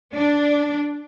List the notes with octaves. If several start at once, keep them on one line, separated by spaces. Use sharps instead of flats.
D4